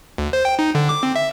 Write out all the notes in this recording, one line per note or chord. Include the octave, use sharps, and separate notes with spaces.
D2
C5
G5
D#4
D3
D6
C4
E5